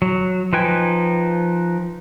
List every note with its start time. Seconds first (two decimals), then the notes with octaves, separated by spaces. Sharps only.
0.02 F#3
0.53 F3 D#4 B4 G5 G#5